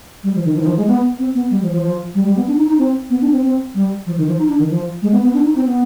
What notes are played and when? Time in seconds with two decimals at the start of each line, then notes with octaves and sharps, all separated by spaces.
0.23 G3
0.35 F3
0.45 D#3
0.55 F3
0.61 D#3
0.66 F3
0.77 G#3
0.87 B3
1.19 C4
1.35 B3
1.51 G3
1.62 F3
1.73 F3
1.83 F3
2.15 G3
2.26 G3
2.36 B3
2.47 D4
2.57 D#4
2.68 D#4
2.79 C4
3.10 B3
3.21 D4
3.32 C4
3.43 C4
3.74 G3
4.06 F3
4.17 D#3
4.28 F3
4.38 D#4
4.49 D4
4.59 D#3
4.70 F3
5.02 G#3
5.12 B3
5.23 B3
5.34 D4
5.45 D#4
5.55 C4
5.66 B3